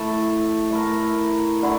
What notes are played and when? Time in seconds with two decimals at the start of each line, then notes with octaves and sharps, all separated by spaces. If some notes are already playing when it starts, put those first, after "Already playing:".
Already playing: A3 E4 A4 E5
0.71 A3 E4 A#4
1.63 D3 A3 E4